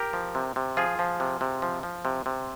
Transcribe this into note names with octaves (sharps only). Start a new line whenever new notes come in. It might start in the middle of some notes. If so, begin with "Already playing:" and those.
Already playing: G4 A#4
F3
C3
C3
F3 F4 G#4
F3
C3
C3
F3
F3
C3
C3